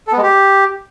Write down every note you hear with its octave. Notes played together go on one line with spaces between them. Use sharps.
A4
B3
G#3
G4